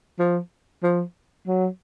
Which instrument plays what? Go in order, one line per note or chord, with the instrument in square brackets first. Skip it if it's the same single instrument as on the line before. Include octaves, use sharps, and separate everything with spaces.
[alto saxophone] F3
F3
F#3